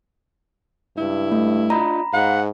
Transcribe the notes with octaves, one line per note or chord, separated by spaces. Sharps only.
C#2 G2 E4
A3
D4 F4 D#5 A#5 B5
G#2 D#5 F5 F#5